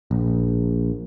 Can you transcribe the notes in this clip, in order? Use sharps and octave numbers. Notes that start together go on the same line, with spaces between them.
A#1